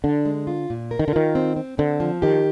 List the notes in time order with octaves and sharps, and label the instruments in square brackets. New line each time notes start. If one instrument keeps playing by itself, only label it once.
[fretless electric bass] D3 [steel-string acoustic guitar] D4
[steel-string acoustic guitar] G#3
F4
A#2
A#4
[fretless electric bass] D#3
D3
[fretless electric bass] D#3 [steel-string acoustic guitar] F4
[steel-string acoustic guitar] C4
C4
[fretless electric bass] D3 [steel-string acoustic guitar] C4
[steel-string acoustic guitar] F3
[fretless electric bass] D#3 [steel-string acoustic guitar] G4